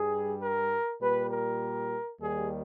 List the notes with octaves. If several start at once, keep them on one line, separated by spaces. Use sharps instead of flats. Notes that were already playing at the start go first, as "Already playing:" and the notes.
Already playing: G2 G3 G#4
A#4
A#2 G3 B4
A#4
D#2 D#3 G3 G#4